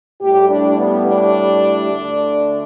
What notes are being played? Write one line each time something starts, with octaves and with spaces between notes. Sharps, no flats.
A2 G3 G4
D4
B3
D4
D2 D3 A3